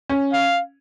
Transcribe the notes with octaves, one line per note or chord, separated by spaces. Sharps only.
C#4
F5